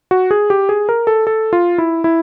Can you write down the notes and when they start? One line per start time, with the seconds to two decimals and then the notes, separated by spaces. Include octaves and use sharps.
0.11 F#4
0.31 G#4
0.50 G4
0.69 G#4
0.89 A#4
1.07 A4
1.27 A4
1.53 F4
1.78 E4
2.04 E4